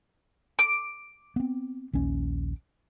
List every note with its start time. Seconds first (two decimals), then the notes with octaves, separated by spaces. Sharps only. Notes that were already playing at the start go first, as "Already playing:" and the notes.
0.59 D6
1.36 B3 C4
1.93 A#1 D#2 C#4